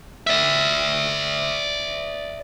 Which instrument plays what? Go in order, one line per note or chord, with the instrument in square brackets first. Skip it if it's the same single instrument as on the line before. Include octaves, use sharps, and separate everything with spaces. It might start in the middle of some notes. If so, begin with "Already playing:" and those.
[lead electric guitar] D5 E5